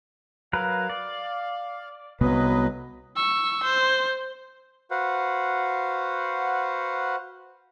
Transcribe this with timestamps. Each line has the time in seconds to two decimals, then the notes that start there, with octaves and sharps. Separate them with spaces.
0.53 F#3 A#4 B4 F5
0.90 D5
2.21 C2 C3 F#3 B3 B4 D#5
3.16 C#6 E6
3.63 C5
4.91 F#4 B4 C5 F5 F#5